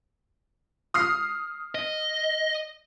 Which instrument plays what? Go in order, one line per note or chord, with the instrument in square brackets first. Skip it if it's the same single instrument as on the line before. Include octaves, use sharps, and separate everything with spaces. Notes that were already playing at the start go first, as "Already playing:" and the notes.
[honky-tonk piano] D#6 F6 C7
[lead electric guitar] D#5